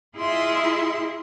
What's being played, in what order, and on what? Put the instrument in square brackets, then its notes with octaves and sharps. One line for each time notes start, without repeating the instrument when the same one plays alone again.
[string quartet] E4 F4 G#4 D#5 E5 C6